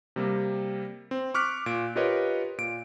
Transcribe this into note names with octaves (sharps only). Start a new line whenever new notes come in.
C3 G3 A#3
C4
C#6 D6 F6 F#6 B6
A#2 D7
F4 G4 A#4 B4 C#5 D#5
A#2 D7